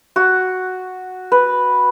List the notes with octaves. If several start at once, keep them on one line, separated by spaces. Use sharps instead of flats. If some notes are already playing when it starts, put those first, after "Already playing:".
F#4
B4